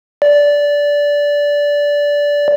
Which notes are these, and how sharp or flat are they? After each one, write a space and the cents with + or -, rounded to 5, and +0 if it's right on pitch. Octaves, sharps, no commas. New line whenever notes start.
D5 -15